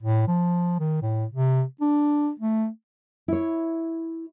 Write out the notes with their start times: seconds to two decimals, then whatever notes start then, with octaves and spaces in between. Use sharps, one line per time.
0.03 A2
0.28 F3
0.79 D#3
1.02 A2
1.32 C3
1.81 D4
2.39 A3
3.28 E4 C#5